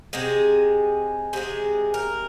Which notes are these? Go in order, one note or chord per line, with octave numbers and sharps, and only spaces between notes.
C3 G#3 G#4
C3 F3 G#3 G#4
A#4